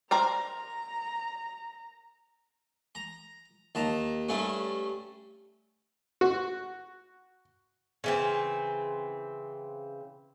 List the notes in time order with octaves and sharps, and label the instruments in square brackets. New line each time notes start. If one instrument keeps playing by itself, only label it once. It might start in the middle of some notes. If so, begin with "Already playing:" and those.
[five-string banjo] A#4 C5 D5 [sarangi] A#5
[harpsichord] A#5
D#2 A5 A#5
G2 A3 C#4
[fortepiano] F#4
[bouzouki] C#3 E3 C4